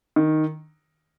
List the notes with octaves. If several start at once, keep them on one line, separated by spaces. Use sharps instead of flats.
D#3